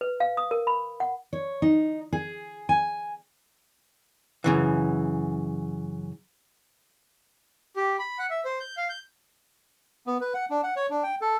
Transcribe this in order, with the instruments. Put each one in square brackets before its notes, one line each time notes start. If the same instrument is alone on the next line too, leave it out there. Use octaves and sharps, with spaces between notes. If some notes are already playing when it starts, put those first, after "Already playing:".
[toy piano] B4
F5
D#6
A#4
B5
F#5
[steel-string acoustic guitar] C#5
D#4
G#4
G#5
[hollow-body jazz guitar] F#2 C#3 E3
[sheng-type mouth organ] G4
B5
F#5
E5
C5
G6
F5
G6
[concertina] B3
B4
F#5
D4
F#5
C#5
D4
G5
A4